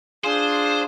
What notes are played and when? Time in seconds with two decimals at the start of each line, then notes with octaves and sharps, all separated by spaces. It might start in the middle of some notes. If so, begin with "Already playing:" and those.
0.24 D4 F4 G#4 C5